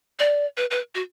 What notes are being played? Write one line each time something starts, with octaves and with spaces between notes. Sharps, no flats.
D5
B4
B4
F#4